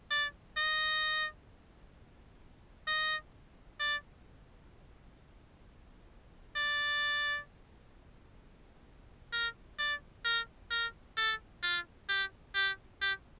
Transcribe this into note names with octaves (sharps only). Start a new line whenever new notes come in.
D5
D#5
D#5
D5
D5
A#4
D5
A#4
A#4
A4
F4
G4
G4
G4